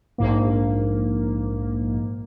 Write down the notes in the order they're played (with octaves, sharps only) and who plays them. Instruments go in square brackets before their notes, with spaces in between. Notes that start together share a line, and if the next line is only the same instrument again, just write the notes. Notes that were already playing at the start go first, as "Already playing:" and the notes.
[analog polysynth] A#1 G#2 A#3